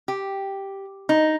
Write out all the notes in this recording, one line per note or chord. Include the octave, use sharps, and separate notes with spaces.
G4
D#4